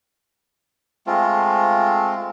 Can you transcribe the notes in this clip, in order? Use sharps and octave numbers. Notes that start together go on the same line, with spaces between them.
G#3 A3 C4 F4